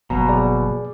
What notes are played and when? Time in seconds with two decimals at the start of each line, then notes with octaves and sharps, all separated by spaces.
0.10 G1 B2 F#3 A#3 A#5
0.29 G#4 D5